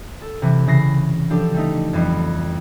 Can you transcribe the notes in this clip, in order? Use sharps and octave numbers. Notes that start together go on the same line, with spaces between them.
A4
C3 E3
C#3 E3 A#6 C7
F3 D4 G4 A4
G3 A3 D#4
F2 E3 G3 C4 B4